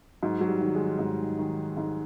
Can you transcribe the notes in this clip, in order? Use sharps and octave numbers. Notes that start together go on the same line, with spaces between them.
G#2 F#3
F#3
G3
D#3
G#3
G#2
D#3
G#2